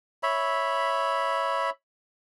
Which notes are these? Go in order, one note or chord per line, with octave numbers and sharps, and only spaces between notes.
C#5 E5 B5